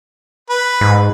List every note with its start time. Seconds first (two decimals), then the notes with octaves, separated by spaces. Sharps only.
0.50 B4
0.81 G#2